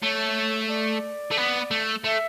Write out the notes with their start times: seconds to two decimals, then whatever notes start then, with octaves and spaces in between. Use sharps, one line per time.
0.02 A3 C#5
0.69 D5
1.31 A3
1.37 B3
1.71 A3
2.04 A3 E5